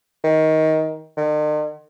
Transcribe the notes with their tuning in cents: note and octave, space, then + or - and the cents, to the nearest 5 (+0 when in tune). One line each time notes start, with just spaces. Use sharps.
D#3 +20
D#3 -45